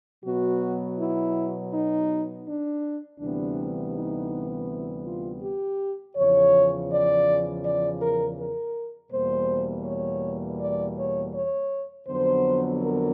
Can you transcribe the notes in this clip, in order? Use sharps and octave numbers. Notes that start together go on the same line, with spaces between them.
B2 F#3 B3 F#4
E4
D#4
D4
D2 C3 E3 G3 B3 D4
D#4
E4
F4
G4
E2 C#3 F3 C#5
D5
D5
A#4
A#4
E2 B2 G3 A#3 C5
C#5
D5
C#5
C#5
F2 D3 F#3 B3 C5
A#4